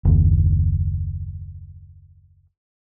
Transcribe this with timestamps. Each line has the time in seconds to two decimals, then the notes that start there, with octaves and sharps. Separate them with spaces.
0.05 F#1 D#2